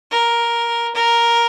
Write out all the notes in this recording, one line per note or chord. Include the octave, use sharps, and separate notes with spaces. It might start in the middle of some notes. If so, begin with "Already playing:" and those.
A#4
A#4